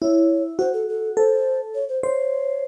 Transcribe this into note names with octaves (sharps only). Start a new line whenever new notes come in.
E4 C#5
F#4 C5
A4
A4
A4 C5
C#5
C5
C5 C#5